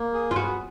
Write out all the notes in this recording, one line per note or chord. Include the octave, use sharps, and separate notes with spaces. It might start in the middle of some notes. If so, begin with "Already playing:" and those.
Already playing: A#3
G#4
F4
B3 F#4